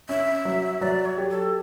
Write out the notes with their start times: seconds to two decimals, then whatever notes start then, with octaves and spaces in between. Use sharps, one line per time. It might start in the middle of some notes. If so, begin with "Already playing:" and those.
0.09 C#4 E5
0.45 F#3
0.81 F#3 D5
1.05 C#5
1.17 G4
1.30 A4